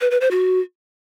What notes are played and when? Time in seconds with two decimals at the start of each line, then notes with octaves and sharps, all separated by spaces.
0.01 B4
0.11 B4
0.21 C5
0.31 F#4